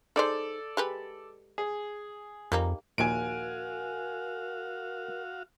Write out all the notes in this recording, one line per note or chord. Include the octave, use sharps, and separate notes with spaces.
D#4 G#4 A4 C5 D5
G#3 G4 B4
G#4
F2 G3 A#3 D#4
A#1 D#2 A#2 F#4 A#4 F5 G#5 D7